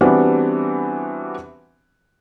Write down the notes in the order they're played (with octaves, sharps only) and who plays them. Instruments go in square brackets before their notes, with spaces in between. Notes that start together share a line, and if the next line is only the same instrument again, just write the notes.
[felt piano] E3 G3 B3 C4 D4 F#4